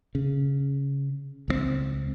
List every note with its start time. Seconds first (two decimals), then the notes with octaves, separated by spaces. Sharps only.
0.15 C#3
1.48 C#2 F3 C4